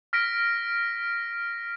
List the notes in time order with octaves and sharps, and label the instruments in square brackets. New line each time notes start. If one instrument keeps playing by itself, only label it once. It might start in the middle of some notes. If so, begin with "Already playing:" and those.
[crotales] F6 A#6 B6 D7